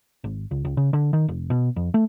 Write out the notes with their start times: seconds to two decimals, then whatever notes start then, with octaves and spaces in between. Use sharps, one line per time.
0.24 G#1
0.51 C#2
0.65 C#2
0.77 C#3
0.93 D3
1.13 D#3
1.28 F1
1.50 B2
1.76 F2
1.94 A3